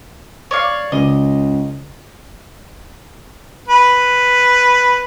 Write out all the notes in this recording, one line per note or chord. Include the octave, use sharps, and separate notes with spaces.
C#5 D5 F5
C#2 C#3 D#5
B4